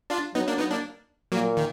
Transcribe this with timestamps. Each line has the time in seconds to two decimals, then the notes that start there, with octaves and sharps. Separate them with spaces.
0.10 D4 F4
0.35 F#3 B3 D#4
0.48 A#3 D4
0.59 B3 D#4
0.71 A#3 D4
1.32 A#2 F#3 A#3
1.57 D#3